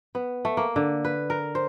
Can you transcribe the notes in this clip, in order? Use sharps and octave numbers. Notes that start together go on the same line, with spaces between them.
B3
A3
A#3
D3
B4
A#4
C5